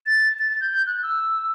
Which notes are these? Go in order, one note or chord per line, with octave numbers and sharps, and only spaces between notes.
A6
A6
A6
G6
G6
F#6
E6